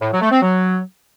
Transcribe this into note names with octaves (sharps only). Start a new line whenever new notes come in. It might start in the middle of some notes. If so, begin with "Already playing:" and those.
A2
F#3
A3
C4
F#3